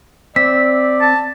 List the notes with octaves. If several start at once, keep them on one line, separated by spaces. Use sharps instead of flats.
C4 D5 E5 B6
A5